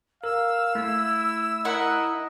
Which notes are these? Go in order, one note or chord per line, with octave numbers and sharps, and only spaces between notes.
A#4 F5 E6
A3 E4
E4 A#4 D#5 F#5